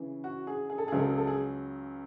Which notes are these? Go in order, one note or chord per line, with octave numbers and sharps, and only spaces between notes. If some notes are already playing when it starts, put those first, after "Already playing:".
Already playing: C#3 E3
F#4
G#4
G#4
A4
C#2 C#3 F#3 G#4
A4
G#4
A4
G#4